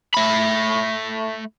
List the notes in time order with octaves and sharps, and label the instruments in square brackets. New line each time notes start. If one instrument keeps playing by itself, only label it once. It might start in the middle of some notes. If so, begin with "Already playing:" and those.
[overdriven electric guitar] A3 B5